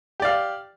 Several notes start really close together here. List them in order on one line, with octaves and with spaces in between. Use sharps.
G4 D5 F5